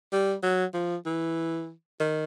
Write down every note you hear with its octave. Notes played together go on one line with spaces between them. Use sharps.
G3
F#3
F3
E3
D#3